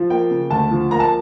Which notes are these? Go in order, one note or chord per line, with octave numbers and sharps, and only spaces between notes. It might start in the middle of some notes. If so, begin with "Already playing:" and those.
Already playing: F3
A#3 G5
C#3
D2 A5
F3
A#3 A#5
A5